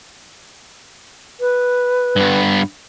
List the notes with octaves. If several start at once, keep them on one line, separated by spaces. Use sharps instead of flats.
B4
G2 B3